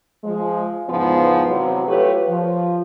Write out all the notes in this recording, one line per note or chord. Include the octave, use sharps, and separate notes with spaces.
F3 G#3
E2 G#2 C#3 F3 B3
C3 E3 F#3
A3 F4 G4 B4 C#5
F3